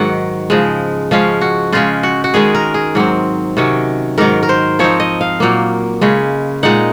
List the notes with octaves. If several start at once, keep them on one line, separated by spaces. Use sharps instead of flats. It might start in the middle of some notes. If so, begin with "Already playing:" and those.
Already playing: G#2 D#3 F#3 F#5
C#3 F3 G#3
F3 G#3 C#4 F5
F#4
C#3 G#3 C#4 F4
F#4
F#4
D#3 G#3 C#4 G#4
A#4
G#4
G#2 F#3 C4
C3 D#3 F#3 C#4
G#2 D#3 F#3 A#4
A#4
C5
F3 C4 D#4 C#5
D#5
F5
A#2 F#3 A#3
C#3 G#3 C#4
A#2 G#3 D#4 F#5